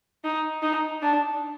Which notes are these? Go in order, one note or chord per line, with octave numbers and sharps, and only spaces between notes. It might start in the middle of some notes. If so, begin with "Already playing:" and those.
D#4
D#4
D4